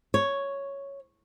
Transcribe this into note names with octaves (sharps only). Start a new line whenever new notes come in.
C#5